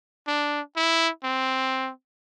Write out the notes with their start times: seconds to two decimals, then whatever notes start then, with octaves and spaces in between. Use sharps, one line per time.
0.27 D4
0.76 E4
1.23 C4